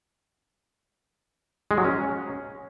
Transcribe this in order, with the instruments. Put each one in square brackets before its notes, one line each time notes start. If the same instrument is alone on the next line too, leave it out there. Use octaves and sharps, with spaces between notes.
[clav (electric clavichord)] G#3
F#3
C#4